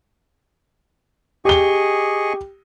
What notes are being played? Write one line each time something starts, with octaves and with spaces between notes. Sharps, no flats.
G4 G#4 D#5 C#6 G7